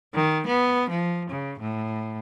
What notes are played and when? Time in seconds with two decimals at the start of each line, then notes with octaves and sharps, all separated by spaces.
0.15 D#3
0.47 B3
0.90 F3
1.30 C#3
1.60 A2